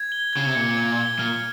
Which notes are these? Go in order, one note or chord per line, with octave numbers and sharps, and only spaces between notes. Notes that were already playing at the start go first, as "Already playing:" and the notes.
Already playing: G#6
G7
C#3 G#6
C3
A#2 C#7
G#6
G7
A#2 F6